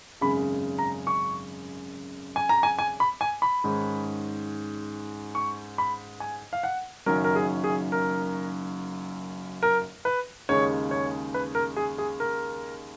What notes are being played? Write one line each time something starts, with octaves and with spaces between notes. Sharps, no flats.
G#1 F#2 C#3 G#3 B5
A#5
C#6
G#5
A#5
G#5
G#5
B5
G#5
B5
G#2 D#3 G#3 C#4
C#6
B5
G#5
F5
F#5
F#1 F#2 D#3 F#3 C#4 A#4
A#4
G#4
G#4
A#4
A#4
B4
D#2 C#3 G#3 D#4 C#5
C#5
B4
A#4
G#4
G#4
A#4